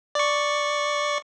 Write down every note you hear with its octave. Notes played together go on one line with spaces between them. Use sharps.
D5 C#6